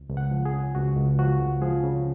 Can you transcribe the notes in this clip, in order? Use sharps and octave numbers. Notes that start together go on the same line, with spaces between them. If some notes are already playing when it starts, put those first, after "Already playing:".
Already playing: C#2
C#2
F#5
F3
G#4
C#3
C#2 F#4
C#2
F3 F#4
C#2
F3 G#4
C#3